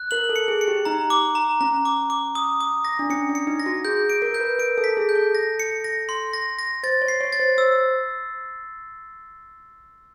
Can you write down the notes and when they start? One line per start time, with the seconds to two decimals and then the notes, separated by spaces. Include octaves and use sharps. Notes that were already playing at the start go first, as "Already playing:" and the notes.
Already playing: F#6
0.11 A#4 F#7
0.29 A4
0.36 C#7
0.48 G#4
0.61 C#7
0.68 G4
0.85 D#4 A#5
1.10 D6
1.35 A#5
1.61 C#4 A#5
1.85 D6
2.10 D6
2.35 D#6
2.60 D#6
2.85 A#6
2.99 D4
3.10 C#4 C#7
3.29 D4
3.35 C#7
3.47 D#4
3.60 A#6
3.66 F#4
3.85 G#4 G6
4.10 D7
4.22 A#4
4.34 A#4 G6
4.40 B4
4.59 A#4 D7
4.78 A4
4.84 B6
4.97 G#4
5.09 G6
5.16 A4
5.35 A#6
5.59 C#7
5.84 A#6
6.09 C6
6.33 A#6
6.59 A#6
6.83 C5 A6
7.02 C#5
7.08 C7
7.21 C#5
7.32 A6
7.40 C5
7.57 C5 E6